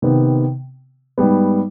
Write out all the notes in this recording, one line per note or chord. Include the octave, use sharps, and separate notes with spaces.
C3 D#3 B3
G#2 G3 B3